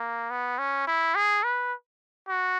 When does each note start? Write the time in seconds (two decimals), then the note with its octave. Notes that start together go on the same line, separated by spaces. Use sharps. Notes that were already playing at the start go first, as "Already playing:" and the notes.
Already playing: A#3
0.30 B3
0.58 C#4
0.87 E4
1.15 G#4
1.44 B4
2.28 F#4